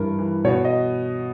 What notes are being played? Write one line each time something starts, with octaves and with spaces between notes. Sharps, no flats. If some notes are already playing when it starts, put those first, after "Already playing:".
Already playing: G2 E3 A#4
E3
B2 C#5
D#5